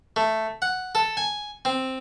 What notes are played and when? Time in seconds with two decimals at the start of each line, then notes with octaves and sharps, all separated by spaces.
0.16 A3
0.62 F#5
0.95 A4
1.17 G#5
1.65 C4